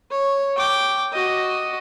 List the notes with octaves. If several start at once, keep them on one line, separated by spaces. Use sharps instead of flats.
C#5
G5 D6
F#4 D#5